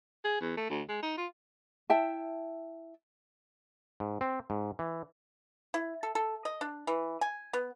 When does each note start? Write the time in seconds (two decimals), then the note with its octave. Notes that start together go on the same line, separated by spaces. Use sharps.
0.25 G#4
0.41 E2
0.57 A3
0.70 D2
0.89 G#3
1.02 D#4
1.18 F4
1.90 E4 E5 G5 A5
4.00 G#2
4.21 C4
4.50 G#2
4.79 E3
5.74 E4
6.03 A4
6.15 A4
6.45 D#5
6.61 D4
6.87 E3
7.21 G#5
7.53 B3